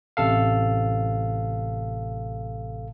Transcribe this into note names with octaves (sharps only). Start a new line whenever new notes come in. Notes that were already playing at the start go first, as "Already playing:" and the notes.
A1 C3 A4 F5